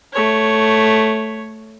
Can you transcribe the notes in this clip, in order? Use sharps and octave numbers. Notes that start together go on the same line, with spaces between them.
A3 C#5